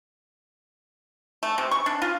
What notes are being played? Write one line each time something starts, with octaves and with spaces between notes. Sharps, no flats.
A3
C3
C#6
D4
F4